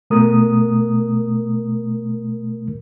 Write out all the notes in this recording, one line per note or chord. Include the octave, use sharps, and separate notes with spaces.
B2 A3 A#4 D#6